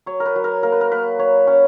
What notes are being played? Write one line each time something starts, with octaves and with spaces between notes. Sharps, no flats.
F#3 C#5
A#4
B4
F#3
A#4
A#3 A#4
B4
A#4
A#3 B4
F#3 C#5
C#4 C#5